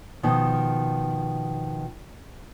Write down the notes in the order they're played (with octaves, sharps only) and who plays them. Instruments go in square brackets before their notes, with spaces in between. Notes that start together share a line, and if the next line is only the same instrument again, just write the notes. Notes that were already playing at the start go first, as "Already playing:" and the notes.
[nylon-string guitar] B2 D#3 F3